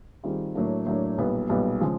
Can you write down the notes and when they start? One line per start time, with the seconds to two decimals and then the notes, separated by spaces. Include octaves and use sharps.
0.23 D#3 G3 C4 F4 G#4
0.55 A2 F#3 A#3 D4
0.86 A2 F#3 A#3 D4
1.18 B1 A#2 G3 B3
1.49 B1 A#2 G3 B3
1.81 C#3 F3 G#3